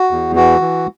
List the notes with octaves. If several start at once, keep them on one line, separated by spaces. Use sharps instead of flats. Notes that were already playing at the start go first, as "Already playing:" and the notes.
Already playing: F#4
E2
E3 F#4
E3